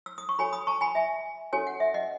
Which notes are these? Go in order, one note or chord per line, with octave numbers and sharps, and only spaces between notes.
E6
D#6
C#6
F#4 A4 C#5 G#5 B5
B5 D#6
A5 C#6
G#5 B5
E5 G#5
C#4 F#4 A4 C#5 G#5
F#5
E5
D#5 F#5